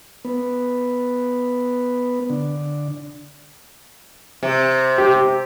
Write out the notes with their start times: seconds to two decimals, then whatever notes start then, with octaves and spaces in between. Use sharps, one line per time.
0.25 B3
2.30 D3
4.43 C3
4.98 G4